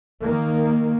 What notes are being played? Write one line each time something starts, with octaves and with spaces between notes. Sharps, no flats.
D#3 A#3